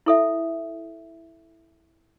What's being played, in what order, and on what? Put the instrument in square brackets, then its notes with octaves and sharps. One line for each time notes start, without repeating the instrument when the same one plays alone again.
[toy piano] E4 A4 E5